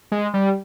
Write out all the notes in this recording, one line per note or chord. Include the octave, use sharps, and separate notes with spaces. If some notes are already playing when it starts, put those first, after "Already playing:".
G#3
G3